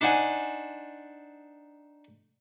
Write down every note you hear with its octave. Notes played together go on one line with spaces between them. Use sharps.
D4 D#4 C5 F#5 G#5